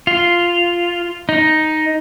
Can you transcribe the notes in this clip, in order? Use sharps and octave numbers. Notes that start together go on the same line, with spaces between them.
F4
D#4